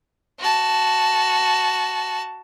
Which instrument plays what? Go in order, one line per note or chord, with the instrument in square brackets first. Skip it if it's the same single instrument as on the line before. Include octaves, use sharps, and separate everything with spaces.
[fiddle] F#4 A5